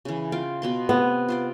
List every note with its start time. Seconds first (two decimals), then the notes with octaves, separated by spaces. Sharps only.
0.05 C#3 E3
0.32 F4 F5 G5
0.62 B2 B3 C6
0.89 C3 B3
1.29 F4 C5 D5